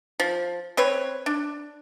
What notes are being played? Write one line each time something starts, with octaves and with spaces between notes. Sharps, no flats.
F3
C4 B4 C#5
D4